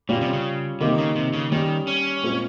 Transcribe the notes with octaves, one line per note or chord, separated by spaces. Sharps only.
A#2 G3 C#4 F4
C3
C#3
C3 D#3 A#3 D#4 G4
C#3
C3
C#3
D#3 G3 C#4 G4
C#4
A#2 G#3 C4 F4